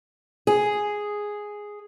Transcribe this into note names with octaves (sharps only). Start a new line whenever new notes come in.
G#4